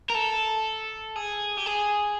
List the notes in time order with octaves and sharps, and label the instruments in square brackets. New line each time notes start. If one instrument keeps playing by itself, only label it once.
[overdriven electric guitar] A#4
A4
G#4
G4
G#4